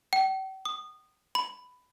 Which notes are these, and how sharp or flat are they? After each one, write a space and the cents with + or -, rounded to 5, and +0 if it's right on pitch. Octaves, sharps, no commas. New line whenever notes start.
G5 -45
D#6 -20
B5 +15